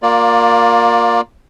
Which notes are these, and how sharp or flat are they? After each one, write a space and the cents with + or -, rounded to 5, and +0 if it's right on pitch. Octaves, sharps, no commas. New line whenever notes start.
A#3 +0 F4 +25 D5 +5